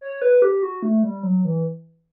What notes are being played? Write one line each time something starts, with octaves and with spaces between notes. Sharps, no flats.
C#5
B4
G4
F#4
A3
G3
F#3
E3